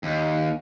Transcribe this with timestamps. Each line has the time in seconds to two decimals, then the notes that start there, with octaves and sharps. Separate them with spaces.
0.03 D#2